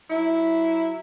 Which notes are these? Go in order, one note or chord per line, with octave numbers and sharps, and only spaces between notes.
F#3 E4